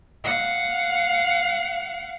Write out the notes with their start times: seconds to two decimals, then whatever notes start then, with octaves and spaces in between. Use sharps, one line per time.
0.24 F5 F#5